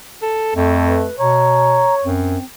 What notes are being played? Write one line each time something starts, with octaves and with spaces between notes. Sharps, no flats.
A4
F2 A3
B4
B2 C#5 A#5
F#2 C4